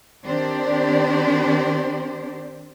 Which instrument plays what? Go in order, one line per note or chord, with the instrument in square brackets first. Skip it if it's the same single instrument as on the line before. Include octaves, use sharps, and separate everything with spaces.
[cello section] D#3 C4 D4 G4 C5 D5